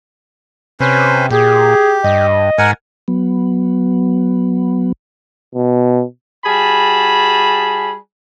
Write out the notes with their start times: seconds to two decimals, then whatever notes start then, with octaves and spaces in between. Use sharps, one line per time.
0.80 C3 C#4 B4 C5
1.30 A#2 G4 G#4
2.04 G2 D#5
2.58 G#2 A#4 F#5 G#5
3.08 F#3 B3
5.54 B2
6.45 G3 F#4 G#4 G#5 A5 B5